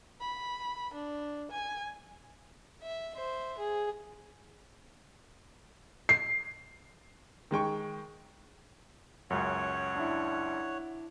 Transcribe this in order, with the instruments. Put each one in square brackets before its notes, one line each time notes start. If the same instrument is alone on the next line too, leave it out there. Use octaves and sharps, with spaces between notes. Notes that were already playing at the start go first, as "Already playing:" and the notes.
[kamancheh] B5
D4
G#5
[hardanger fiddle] E5
C5 E5
G#4
[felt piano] C7
[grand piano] D#3 G#3 G5 C#6
[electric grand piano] C#2 F#2 [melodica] C#5 F#5
[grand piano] D4 E4